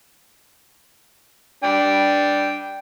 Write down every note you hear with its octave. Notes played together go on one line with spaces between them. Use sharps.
D4 G5